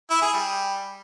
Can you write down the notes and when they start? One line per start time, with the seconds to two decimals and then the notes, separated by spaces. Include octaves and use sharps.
0.10 E4
0.22 G#4
0.33 G3